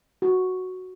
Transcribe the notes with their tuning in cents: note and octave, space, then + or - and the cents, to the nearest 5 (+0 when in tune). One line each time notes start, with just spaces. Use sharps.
F#4 +0